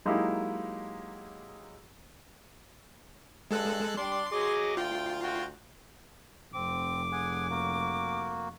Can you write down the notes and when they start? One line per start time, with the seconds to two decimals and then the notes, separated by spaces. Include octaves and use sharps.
0.05 F#3 G#3 A#3 D#4 E4 G4
3.51 G2 G#3 A4 F#6
3.97 G3 D4 C6 D6
4.32 F#3 G#4 D#5 D6
4.77 D2 F4 G5
5.23 F#4 G5
6.54 F1 C4 D6
7.12 G#4 F#5 G#5
7.50 A#3 F#4